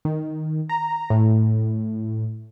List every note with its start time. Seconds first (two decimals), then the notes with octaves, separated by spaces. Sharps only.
0.05 D#3
0.69 A#5
1.10 A2